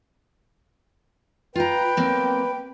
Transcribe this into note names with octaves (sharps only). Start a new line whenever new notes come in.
F4 B4 G5 A#5
F#3 A#3 C4